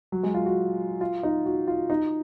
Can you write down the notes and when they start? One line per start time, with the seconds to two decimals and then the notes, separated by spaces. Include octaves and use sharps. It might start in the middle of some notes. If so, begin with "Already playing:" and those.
0.12 F#3
0.23 G#3
0.34 F4
0.46 F#4
1.01 F4
1.23 D#4
1.46 F#4
1.67 F4
1.90 D#4